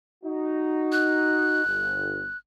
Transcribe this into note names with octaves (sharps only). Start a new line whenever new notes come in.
D#4 F#4
F#6
G1